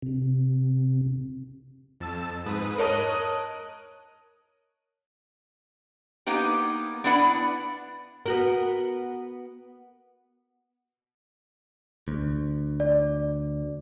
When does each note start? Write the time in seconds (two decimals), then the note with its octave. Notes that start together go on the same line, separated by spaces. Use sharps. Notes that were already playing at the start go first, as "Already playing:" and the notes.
0.02 C3
2.00 F2 A5 E6
2.46 G#2 B4 D#6
2.78 A#4 C#5 D#5 A5 D#6 F#6
6.27 A#3 B3 D#4 G4
7.04 B3 D4 E4 B4 D5 F#5
8.26 B3 F#4 A#4
12.08 D2
12.80 D5